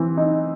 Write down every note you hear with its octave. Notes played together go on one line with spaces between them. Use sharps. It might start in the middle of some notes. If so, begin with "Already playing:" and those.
Already playing: E3 C4
D#4